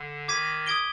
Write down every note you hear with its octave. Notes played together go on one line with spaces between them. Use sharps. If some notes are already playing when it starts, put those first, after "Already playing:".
Already playing: D3
D#3 D6 G#6 B6 D#7
D#6 G#6 D7 G7